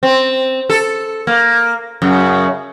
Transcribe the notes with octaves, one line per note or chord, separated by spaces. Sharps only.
C4
A4
A#3
F#2 C#3